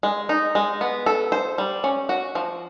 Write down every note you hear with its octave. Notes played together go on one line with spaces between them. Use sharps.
G#3
D#4
G#3
B3
A4
C5
G3
C#4
F#4
F3